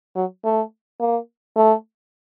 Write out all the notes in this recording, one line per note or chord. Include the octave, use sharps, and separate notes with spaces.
F#3
A3
A#3
A3